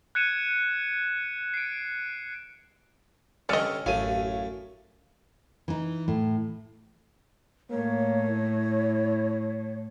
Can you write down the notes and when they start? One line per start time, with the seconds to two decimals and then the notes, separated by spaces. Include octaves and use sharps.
0.15 F#6 G#6 C#7 D#7 E7
1.54 C7 D7
3.49 G2 D3 C#4 D5 D#5 E6 F6 C#7
3.86 A1 F#2 A3 C#5 F5 D#7
5.68 E3 D#4
6.08 A2
7.70 A2 A#3 C#5
8.31 E4